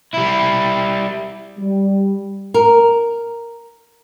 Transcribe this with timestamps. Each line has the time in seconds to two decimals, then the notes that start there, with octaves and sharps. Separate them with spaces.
0.14 G3 E4
1.58 G3
2.54 A#4